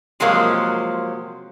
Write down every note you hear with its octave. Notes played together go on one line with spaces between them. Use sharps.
C3 F3 F#3 G#3 A#3